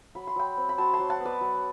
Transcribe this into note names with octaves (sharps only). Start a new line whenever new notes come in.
F#3 B5
C6
F#3 G5 B5
C4
B5
F#3 A5 C6
A5 C6
F#3
F#5 A5
B3
B4 D5
F#3